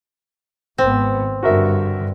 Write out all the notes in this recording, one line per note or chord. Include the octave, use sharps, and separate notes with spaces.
G#1 B3 C4
G2 D3 F#4 A#4 E5